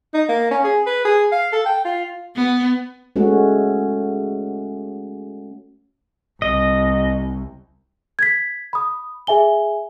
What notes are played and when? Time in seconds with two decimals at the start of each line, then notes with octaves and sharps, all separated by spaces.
0.14 D#4
0.29 A#3
0.51 C#4
0.64 G#4
0.86 B4
1.05 G#4
1.32 F5
1.53 A4
1.66 G5
1.85 F4
2.35 B3
3.16 G#3 A3 C#4 F#4
6.42 C2 D#5
8.19 G#6 B6
8.73 B5 D#6
9.27 G#4 E5 G#5 G7